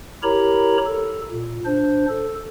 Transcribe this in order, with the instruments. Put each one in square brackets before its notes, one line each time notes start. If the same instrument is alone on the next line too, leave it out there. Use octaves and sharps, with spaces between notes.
[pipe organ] E4 G4 A#4 C#5 A#5 B5
A4
A#2
D4 C5
A4